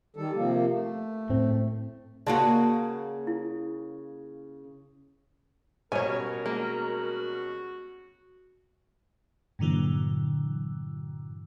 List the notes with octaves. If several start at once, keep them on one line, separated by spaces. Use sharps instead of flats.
D#3 G3 A4
C3 F3 A#3
A3
A2 C4
C#3 A#3 F#4 D5 A5 C6
E4
B2 G3 C#4 A#4 C#5 G#5
G#3 A#3 F#4
G2 A#2 D3 E3 F#3